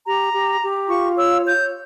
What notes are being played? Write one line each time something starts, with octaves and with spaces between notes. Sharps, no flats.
G4 A#5
G4
G4
F4 C#6
C#5 E6
C#5 G6